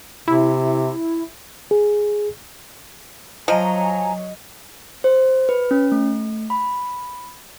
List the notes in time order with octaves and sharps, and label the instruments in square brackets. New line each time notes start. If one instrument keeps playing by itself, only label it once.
[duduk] C3 [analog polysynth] E4
[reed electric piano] G#4
[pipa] F3 [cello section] F#3 C#5 [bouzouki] D#5 [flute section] G#5 A#5
[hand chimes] C5
B4
C#4
A3
B5